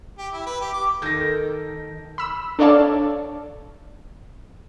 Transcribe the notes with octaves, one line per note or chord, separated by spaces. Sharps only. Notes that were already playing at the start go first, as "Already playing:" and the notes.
G4
E4
B4
G4
D6
D#3 A4 A#4 G6 A#6
B5 E6
D4 A4 C#5 D5 F5 A5